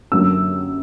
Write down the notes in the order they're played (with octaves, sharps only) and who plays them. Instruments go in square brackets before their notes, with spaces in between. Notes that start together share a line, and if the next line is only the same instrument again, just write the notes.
[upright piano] F#2 D3 F#3 A#3 E6